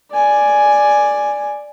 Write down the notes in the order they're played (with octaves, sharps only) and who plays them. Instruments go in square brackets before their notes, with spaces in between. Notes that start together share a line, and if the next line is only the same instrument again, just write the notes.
[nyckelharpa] D5 G#5